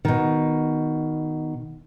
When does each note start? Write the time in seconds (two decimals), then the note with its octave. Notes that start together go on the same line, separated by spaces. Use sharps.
0.05 B2 D#3